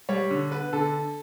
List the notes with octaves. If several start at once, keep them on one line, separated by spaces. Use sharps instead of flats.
G3 C#5
D3
B3 B4
D3 A4